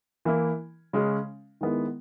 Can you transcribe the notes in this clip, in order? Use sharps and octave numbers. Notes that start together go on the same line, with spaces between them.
E3 A#3 E4
C#3 G#3 C#4
D#3 G#3 B3 E4